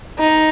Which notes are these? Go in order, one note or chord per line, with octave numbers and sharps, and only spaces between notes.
D#4